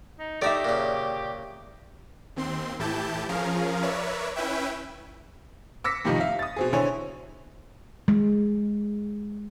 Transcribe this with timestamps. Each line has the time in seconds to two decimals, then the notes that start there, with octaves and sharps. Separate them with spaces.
0.19 D#4
0.42 A3 D#4 G4 D5 E5
0.65 A#2 C#3
2.36 D#2 C4 C6
2.79 A2 E3 E4 G4 A5 G6
3.29 F3 C#4 G#4 A#4 F5
3.82 A#4 B4 C#5 D5 E5
4.36 C#4 E4 B4 E5 G5
5.84 D6 E6 A#6 B6 C#7
6.05 F2 A2 C3 D#3 F3 D#4
6.20 E5 F5
6.39 D#6 A6
6.56 B2 C4 G#4
6.73 D3 C4 E4 C#5 G#5
8.08 G#3